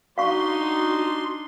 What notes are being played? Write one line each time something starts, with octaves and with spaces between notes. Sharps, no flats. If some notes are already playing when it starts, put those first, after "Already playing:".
D4 D#4 F#4 F5 C6 C#6